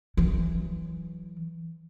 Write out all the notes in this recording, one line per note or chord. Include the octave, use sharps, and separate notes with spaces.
E3 F#3